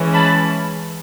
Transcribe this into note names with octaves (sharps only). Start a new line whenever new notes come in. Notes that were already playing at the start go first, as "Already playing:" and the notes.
Already playing: E3 G#3 C#4
A5 B5